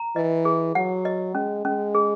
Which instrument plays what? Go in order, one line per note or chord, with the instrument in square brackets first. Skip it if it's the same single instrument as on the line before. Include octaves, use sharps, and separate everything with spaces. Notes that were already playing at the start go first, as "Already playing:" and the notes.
Already playing: [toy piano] A#5
[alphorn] E3 [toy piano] D#5
[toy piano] G#4
[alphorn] F#3 [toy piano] F#5
[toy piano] D#5
[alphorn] G#3 [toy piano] C#4
[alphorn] G#3 [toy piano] C#4
[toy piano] G#4